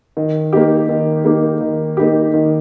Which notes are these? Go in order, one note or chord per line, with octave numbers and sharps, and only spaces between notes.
D#3
A#3 D#4 G4
D#3
A#3 D#4 G4
D#3
A#3 D#4 G4
D#3